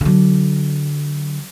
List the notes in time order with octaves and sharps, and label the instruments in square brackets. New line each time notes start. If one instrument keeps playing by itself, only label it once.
[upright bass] D3 F#3